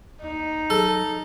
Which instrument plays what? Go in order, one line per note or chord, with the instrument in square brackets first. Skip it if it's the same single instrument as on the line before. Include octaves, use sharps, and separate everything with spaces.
[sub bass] D#2 [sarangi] D#4
[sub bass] F#3 [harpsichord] A4